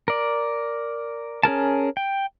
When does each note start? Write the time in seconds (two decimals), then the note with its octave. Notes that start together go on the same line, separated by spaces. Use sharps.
0.08 A#4 D5
1.43 C#4 G#4 A#4 A5
1.97 G5